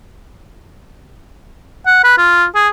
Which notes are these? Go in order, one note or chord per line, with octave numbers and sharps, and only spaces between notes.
F#5
B4
F4
G#4